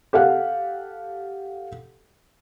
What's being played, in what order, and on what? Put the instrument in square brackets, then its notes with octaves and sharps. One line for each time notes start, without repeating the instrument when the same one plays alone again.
[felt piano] G4 A4 F5 F#5